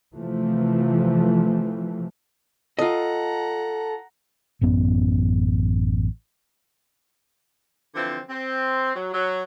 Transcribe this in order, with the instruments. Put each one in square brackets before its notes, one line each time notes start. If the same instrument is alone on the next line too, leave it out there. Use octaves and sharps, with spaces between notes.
[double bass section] C3 E3 F3 A3
[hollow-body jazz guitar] F4 D#5 [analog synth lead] A4 [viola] F#5 A#5
[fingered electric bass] A1 F#2 B3 C#4
[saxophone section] D3 E3 F3 C4
C4
F#3
F#3